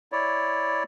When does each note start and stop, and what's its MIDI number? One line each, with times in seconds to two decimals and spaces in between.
0.12 0.83 64
0.12 0.83 73
0.12 0.83 74